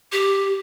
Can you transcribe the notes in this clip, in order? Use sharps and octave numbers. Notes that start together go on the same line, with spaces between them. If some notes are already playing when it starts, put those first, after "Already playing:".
G4